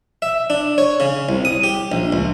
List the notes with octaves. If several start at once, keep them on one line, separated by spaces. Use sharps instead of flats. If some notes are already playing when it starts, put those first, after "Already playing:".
E5
D4
C#5
C#3
C2
D#6
G4
A#1
C#2